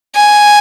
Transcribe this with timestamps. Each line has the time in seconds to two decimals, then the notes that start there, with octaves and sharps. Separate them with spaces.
0.15 G#5